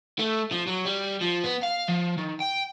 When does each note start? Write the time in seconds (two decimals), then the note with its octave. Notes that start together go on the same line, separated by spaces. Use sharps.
0.19 A3
0.51 F3
0.67 F#3
0.85 G3
1.21 F3
1.43 B3
1.63 F5
1.88 F3
2.18 D#3
2.40 G5